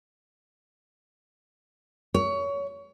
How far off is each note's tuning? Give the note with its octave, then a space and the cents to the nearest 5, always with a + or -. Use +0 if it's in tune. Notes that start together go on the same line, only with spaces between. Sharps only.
C#5 +25